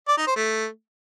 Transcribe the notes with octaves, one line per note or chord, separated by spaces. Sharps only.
D5
D#4
C5
A3